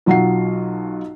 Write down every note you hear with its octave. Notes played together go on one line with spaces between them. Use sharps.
B1 F#3 F4 F#4 F#5 C7